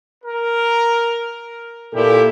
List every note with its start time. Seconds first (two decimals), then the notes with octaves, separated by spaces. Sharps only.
0.24 A#4
1.94 A#2 E4 G4 A4